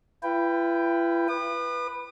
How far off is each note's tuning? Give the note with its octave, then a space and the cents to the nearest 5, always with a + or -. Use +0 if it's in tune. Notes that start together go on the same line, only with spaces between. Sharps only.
E4 +45 B4 +0 G5 +5
B4 +0 D#6 -45